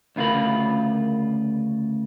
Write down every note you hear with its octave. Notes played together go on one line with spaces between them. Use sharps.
D2 C#3 F4 A#4 B5